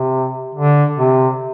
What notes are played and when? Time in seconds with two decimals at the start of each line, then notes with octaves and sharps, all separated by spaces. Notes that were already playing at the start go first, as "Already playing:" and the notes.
Already playing: C3
0.55 D3
0.98 C3